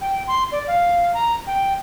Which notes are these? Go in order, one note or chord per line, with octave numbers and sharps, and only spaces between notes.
G5
C6
D5
F5
A#5
G5